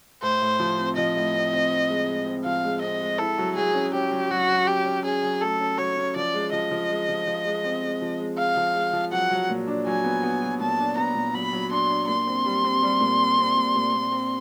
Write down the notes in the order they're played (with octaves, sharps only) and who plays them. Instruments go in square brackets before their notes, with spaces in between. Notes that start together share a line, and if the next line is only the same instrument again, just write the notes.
[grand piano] A2 [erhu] C5
[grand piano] A2
F3
C4
[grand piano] F3 [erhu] D#5
[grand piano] A2
C4
C4
C4
G#3
G#3
C4
[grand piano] F3 [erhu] F5
[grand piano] G#3
[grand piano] C4 [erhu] D#5
[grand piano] G#3
[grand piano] E4 [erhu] A4
[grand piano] F#3
[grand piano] F#3 [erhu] G#4
[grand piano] C#4
[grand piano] C#4 [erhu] G4
[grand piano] F#3
[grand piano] F#3 [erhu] F#4
[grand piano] F#3
[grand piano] C#4 [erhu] G4
[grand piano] C#4
[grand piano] C#4 [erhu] G#4
[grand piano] F#3
[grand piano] A3 [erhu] A4
[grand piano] C#4
[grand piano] F#3 [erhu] C#5
[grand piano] C#4
[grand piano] F3 [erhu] D5
[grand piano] G#3
[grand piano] F3 [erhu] D#5
[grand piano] F3
G#3
F3
F3
G#3
C4
G#3
F3
G#3
[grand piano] G#3 [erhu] F5
[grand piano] F3
G#3
F3
[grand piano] F#3 [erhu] F#5
[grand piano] F#3
A#2
D4
[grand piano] F#3 [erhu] G#5
[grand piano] B3
B3
F#3
[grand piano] A#2 [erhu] A5
[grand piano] D4
[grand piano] B3 [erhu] A#5
[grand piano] A#2
[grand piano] F#3 [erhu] B5
[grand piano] F#3
[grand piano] D4 [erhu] C6
[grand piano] D4
[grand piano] A#2 [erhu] C6
[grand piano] C4
G3
C4
G3
A#2
G3
C4
A#2
A#2
A#2
C4